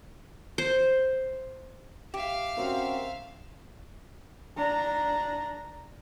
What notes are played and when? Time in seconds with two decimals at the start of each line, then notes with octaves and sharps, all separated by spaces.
0.58 C5
2.14 G4 E5 F5
2.57 C4 C#4 F#4 A#4
4.56 D4 A#5